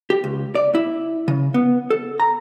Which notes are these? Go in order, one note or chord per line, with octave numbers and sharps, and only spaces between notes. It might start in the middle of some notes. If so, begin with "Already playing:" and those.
G4
C#2
D5
E4
C#3
B3
A4
A#5